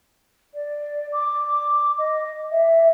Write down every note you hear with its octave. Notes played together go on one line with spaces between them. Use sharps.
D5
D6
D#5
E5